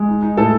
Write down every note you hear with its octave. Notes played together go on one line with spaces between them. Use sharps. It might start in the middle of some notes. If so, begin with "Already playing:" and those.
Already playing: G#3
D#4
D#4
A2 A4